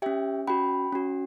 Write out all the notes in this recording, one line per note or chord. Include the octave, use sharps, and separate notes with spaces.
C#4 G4 E5 G5
C#4 F#4 G5 B5
C#4 F#4